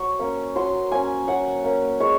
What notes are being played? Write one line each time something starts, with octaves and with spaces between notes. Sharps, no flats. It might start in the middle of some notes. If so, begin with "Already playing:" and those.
Already playing: F#3 C#6
A#3 C#4
F#3 C6
A#3 C#4 G#5
F#3 F#5
A#3 C#4
G#3 C#5